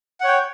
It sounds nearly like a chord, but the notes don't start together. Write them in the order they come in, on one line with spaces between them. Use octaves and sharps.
F#5 C#5 G5